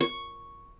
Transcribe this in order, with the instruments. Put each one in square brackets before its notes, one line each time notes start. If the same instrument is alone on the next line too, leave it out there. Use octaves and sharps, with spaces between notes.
[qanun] C#6